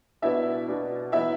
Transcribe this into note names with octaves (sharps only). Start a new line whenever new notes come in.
B2 B3 D4 E4 E5
B2 B3 D4
E3 B3 E4 E5